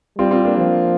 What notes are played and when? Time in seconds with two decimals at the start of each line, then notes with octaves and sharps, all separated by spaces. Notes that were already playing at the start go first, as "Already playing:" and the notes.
0.18 G3 C4 F4
0.31 C4 F4
0.45 A#3 D4
0.58 F3